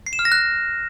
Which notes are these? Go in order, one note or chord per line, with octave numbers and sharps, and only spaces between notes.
C7
E7
F6
A#6
F#6